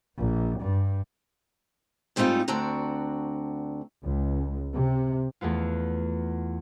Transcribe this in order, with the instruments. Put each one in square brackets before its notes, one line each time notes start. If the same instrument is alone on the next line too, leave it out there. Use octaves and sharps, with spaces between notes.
[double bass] A#1
G2
[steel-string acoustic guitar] G#2 G3 A3 C4 D#4 F4
D2 C4 D4 F#4 A#5
[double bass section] C#2
C3
[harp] E2 A3 B3 F4